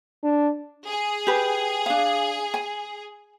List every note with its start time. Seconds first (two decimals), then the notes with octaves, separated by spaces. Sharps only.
0.23 D4
0.88 G#4
1.27 G4 B4
1.86 D4 F5
2.54 G#5